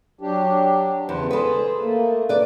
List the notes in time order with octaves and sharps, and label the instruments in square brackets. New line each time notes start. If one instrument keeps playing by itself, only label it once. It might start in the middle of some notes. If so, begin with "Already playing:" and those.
[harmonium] F#3 D4 G4
[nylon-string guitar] E2 [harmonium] C#3 B4 C5
[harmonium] G#4 C5 [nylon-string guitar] A4 B4
[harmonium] A3 A#3
[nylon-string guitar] B4 D5